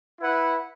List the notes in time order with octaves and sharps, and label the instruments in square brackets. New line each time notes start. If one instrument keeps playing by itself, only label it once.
[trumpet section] E4 B4 F#5